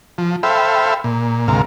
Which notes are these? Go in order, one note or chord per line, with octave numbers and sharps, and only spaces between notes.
F3
A4 C5 E5 F5 G5 B5
A#2
D2 G#2 C3 A#4 F5